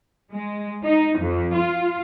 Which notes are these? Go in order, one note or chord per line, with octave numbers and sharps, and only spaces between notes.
G#3
D#4
F2
F4